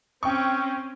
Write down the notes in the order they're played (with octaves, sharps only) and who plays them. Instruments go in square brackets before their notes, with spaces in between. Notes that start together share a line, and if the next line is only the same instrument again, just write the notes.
[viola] C4 C#4 [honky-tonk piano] G5 C#6